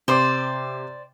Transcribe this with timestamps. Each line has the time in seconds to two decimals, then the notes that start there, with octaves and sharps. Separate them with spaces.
0.08 C3 C5 D5 C6 D6